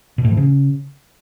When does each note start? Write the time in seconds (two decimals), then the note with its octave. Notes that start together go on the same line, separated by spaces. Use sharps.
0.18 B2
0.24 A2
0.31 F3
0.37 C#3